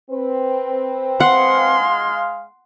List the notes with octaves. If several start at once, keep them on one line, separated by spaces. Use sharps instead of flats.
C4 B4
G#3 F5 F#5 C6